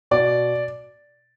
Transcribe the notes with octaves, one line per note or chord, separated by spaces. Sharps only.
B2 D5